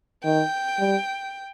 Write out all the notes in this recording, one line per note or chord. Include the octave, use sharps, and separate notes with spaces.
D#3 G5
G3